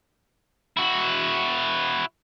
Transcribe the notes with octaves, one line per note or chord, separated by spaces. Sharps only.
E4 F#4